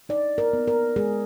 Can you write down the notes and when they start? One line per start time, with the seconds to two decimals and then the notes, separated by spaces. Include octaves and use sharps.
0.09 D#4 D5
0.38 A#4
0.53 B3
0.67 A#4
0.96 G#3 G#4